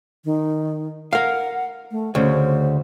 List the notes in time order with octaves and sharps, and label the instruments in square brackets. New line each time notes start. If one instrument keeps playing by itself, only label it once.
[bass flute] D#3
[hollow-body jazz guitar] A#4 F5 [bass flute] F#5
[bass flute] A3
[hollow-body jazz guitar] D2 C#3 [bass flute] C5